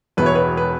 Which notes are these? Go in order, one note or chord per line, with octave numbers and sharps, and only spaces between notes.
E1 E2 B2 B3 E4 B4
C#5
B4
B4